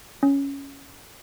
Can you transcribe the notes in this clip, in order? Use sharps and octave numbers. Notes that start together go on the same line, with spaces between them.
C#4